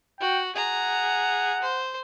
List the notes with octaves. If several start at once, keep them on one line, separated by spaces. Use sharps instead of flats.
F#4 G5
G#4 F#5 A#5
C5